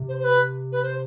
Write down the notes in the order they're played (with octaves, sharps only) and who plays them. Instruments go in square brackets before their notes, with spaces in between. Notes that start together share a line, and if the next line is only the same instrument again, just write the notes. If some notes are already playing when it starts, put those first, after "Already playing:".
Already playing: [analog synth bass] C3
[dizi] C5
C5
B4
B4
C5